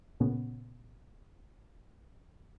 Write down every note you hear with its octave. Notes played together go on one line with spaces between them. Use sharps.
A#2 C#3 B3 C#4